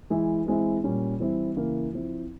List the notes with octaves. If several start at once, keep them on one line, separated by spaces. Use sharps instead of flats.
E3 G#3 E4
E3 G#3 C4 E4
A#2 G3 C#4
E3 G3 C4 E4
C#3 E3 A#3 E4
F3 C4 E4